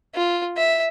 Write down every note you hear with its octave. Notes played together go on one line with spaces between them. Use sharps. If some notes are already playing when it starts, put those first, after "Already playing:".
F4
E5